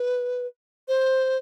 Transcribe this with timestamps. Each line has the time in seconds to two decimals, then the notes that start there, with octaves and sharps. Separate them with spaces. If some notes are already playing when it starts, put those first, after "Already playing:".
Already playing: B4
0.88 C5